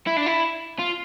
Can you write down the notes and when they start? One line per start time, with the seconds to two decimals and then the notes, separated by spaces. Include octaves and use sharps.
0.07 E4
0.17 D4
0.26 E4
0.79 F4